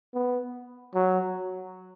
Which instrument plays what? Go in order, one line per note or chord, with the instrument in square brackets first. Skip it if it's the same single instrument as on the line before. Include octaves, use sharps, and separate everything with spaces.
[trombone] B3
F#3